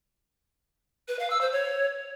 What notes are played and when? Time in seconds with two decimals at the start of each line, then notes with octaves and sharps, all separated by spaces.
1.08 B4
1.19 F5
1.30 E6
1.41 C5
1.52 C#5